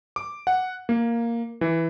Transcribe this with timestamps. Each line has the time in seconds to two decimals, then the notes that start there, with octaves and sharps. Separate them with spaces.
0.16 D6
0.47 F#5
0.89 A#3
1.61 E3